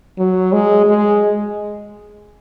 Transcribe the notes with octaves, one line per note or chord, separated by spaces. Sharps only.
F#3
G#3
G#3